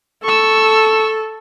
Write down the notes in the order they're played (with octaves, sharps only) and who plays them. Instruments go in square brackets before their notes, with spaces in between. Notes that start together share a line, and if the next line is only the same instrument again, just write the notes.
[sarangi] A4 [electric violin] C#6 E6